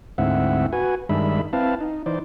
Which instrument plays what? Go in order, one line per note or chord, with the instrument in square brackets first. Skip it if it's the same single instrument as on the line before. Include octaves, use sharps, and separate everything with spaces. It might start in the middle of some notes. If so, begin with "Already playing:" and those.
[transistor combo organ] D2 G#2 C4 E4 E5 F#5
F#4 B4 G#5
G2 D#3 G#3 D4 E5 B5
C4 E4 B4 F5 A5
D#4
E3 D#4 C5 D5